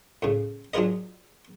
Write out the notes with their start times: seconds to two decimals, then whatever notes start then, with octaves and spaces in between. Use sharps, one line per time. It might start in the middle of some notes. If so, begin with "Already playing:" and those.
0.22 A2 C#3
0.74 F#3 D4 F4 G#4 A#4 D#5